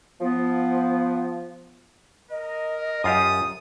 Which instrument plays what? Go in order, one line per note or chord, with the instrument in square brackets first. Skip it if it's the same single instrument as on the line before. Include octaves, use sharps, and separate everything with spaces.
[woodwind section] F3 B3
[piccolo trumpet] A#4 [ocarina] D#5
[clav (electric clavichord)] F#2 F4 G4 [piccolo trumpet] D#6